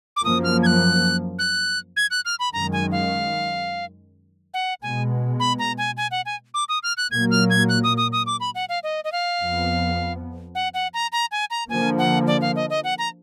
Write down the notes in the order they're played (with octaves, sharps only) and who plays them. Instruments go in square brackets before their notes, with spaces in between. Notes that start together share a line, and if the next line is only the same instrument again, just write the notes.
[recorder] D6
[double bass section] F#2 F3 A#3 [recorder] D#6
[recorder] F6
G#6
F#6
F#6
G#6
F#6
F6
B5
[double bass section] F#2 D#3 G#3 [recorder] A#5
[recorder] G#5
F5
F#5
[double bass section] B2 G#3 B3 [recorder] G#5
[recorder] B5
A#5
G#5
G#5
F#5
G#5
D6
D#6
F6
F#6
[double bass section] A#2 F#3 A#3 [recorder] G#6
[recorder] F6
G#6
F#6
D#6
D#6
D#6
D6
B5
F#5
F5
D#5
D#5
F5
[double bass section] F2 F3 B3
[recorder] F#5
F#5
A#5
A#5
G#5
A#5
[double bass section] D3 F3 A#3 [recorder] G#5
[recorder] F#5
D5
F5
D#5
D#5
F#5
A#5